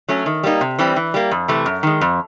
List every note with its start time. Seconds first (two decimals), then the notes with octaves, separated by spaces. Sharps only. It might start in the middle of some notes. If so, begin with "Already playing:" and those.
0.08 F#3 A3 C#4
0.26 D#3
0.43 G3 A#3 D#4
0.61 C3
0.79 E3 G3 C4
0.96 E3
1.14 G3 A#3
1.31 F2
1.48 C3 E3 A3
1.66 F#2
1.83 D#3 G#3
2.01 F2